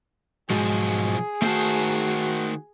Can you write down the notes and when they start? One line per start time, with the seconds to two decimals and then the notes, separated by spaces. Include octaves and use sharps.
0.50 B1 G#2 F3 G#3 F#4 G#4
1.42 D#3 A3 F#4 C5 A5